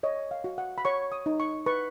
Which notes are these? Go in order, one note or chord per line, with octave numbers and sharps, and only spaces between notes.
C#5 D#5
F5
F#4
F#5
B5
C#5 C#6
D#6
D#4
C#6
B4 C#6